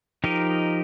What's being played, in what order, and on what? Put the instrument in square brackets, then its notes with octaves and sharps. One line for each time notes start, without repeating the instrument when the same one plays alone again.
[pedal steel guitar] F3 D#4 G4 A#4 D#5